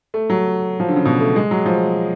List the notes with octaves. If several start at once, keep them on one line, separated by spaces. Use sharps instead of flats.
A3
F#3
F3
D3
C#3
B2
A3
G#3
F#3
F3